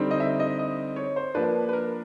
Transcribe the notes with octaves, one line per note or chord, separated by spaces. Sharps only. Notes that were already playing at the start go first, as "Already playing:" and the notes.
Already playing: D3 G3 C4 D#4
D#5
E5
D#5
D#5
C#5
C5
F3 A#3 D4 B4
B4
A#4